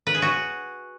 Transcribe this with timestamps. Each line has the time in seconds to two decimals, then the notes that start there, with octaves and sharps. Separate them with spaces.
0.07 B4
0.14 G#4
0.22 F#4